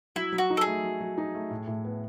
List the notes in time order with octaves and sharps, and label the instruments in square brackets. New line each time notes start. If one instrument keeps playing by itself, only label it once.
[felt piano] F#3 [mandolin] E4
[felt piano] F#3
[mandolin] F#4
[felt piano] D#4
[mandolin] A4
G#4
[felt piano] A3
F#3
F#3
D#4
A3
A2
A2
B3